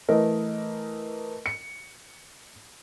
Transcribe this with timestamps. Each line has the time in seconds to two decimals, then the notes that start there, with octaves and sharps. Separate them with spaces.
0.08 E3 A3 A#4 D#5
1.46 C#7